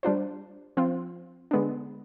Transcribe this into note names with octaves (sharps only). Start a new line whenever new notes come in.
G3 D4 F4 C5
F3 C4 F4
D3 G#3 B3 D4